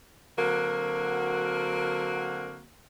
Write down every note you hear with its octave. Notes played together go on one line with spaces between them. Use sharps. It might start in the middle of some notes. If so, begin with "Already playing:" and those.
D3 F#3 A#3 C4 F#4 A#4